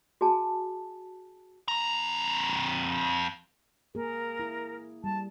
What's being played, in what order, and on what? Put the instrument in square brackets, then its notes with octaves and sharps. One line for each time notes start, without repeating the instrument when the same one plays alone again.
[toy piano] F#4 G#4 G#5 A5
[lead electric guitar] F2 A#5
[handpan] A#3 G#4 [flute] A#4
[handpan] E4
[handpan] G3 [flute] A5